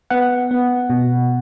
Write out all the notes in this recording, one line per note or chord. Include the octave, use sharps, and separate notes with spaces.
B3 F#5
B3
B2